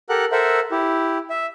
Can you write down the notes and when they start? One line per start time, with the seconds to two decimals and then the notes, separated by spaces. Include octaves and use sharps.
0.09 G4 A4 A#4 F#5 F#6
0.32 A4 A#4 C5 E5 F#5
0.71 E4 G4
1.30 E5